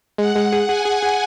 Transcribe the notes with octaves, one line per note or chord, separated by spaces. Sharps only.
G#3 F#5
G#3
G#4
G#4 G#5
G#4
G#4